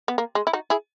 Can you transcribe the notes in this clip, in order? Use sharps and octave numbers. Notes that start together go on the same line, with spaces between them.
B3
A#3
G#3
E4
D#4 F#4
E4 G#4